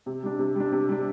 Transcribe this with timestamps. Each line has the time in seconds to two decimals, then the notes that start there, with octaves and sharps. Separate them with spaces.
0.06 C3
0.23 G3 D4
0.39 C3
0.56 G3 D4
0.72 C3
0.89 G3 D4